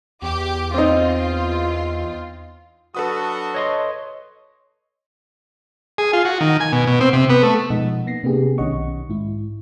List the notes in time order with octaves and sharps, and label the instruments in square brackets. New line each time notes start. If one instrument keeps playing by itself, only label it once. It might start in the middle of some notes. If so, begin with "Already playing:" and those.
[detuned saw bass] E2 [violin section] G4 D6
[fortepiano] C4 D#4 [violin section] F4
[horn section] F#3 D4 F#4 [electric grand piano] A4 B4 D#6
[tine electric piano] C#5 D#5 C6
[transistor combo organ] G#4
F4
F#4
D#3
G#5
B2
B2
C4
C3
B3
A3
[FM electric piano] B2 F3 G#3 D#4 D#5 F#5
A#3 B3 A#6 C7
C3 A#3 B3 D4 G4 G#4
B1 D#3 C#4 D#5 F#5 C#6
G#2 E4